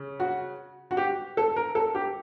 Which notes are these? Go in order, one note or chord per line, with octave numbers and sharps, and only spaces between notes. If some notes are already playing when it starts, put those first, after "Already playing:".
Already playing: C#3
F#4
F#4
G4
A4
A#4
A4
G4